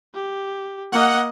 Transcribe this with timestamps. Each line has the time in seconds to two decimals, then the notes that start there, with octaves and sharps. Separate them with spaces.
0.15 G4
0.92 A#3 D#5 F#5